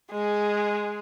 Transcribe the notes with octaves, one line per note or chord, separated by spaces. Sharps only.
G#3 G#4